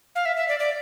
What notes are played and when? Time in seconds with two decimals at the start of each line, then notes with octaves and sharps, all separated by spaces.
0.15 F5
0.26 E5
0.37 E5
0.48 D5
0.60 D5